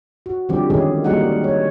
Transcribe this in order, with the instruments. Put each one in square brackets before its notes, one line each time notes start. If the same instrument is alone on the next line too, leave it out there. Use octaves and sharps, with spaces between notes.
[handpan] F#4
D3 E3 F3 G3 C4 G4
D3 D#3 G#3 C#4 G#4
G3 G#3 A#3 D#4 F#4 F#5
C#5